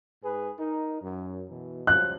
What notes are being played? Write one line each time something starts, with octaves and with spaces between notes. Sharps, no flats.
G#2 G#4 B4
D#4 A#4
F#2
B2 E3
C#2 F3 F#3 F#6